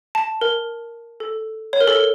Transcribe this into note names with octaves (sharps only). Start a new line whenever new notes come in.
A5
A#4
A4
C#5
A#4
A4
A#4